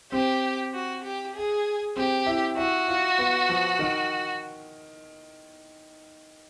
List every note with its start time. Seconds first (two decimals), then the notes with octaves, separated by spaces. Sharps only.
0.12 C4 G4
0.73 F#4
1.04 G4
1.35 G#4
1.96 C4 G4
2.27 E4
2.57 E4 F#4
2.88 F4
3.18 B3
3.49 F3
3.79 D#3